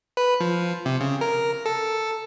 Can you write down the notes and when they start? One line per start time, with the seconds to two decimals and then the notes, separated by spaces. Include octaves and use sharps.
0.17 B4
0.40 F3
0.85 C3
1.01 C#3
1.21 A#4
1.66 A4